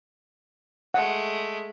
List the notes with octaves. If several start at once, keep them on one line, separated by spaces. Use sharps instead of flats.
G#3 A3 F#5